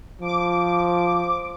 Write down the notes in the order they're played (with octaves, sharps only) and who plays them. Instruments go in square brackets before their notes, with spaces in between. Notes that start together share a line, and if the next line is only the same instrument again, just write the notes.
[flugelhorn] F3 [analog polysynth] D6